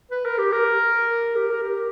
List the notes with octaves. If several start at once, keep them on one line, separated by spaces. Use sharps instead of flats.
B4
A#4
G4
A#4
G4
A#4
G4